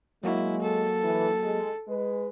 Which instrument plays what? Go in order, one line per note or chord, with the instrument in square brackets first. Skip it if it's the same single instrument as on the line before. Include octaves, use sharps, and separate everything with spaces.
[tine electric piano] F#3 A#3 F#4 [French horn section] G#3 [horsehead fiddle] E4
[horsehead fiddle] A4
[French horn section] E3
G#3
G#3 B4